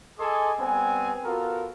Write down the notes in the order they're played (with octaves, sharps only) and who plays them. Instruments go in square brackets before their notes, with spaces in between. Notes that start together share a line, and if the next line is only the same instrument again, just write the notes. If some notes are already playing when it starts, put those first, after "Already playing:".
[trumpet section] G#4 A4 D#5 G#5 C6 D6
G3 B3 C4 G#5
B3 F4 F#4 A4 A#4